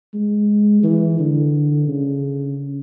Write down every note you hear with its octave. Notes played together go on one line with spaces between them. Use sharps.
G#3
E3
D3
C#3